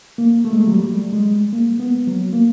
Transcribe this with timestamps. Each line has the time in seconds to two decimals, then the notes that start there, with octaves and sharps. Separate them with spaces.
0.18 A#3
0.45 A3
0.53 G#3
0.60 A3
0.67 F#3
0.72 G3
1.12 G#3
1.53 A#3
1.80 B3
2.07 F#3
2.33 A#3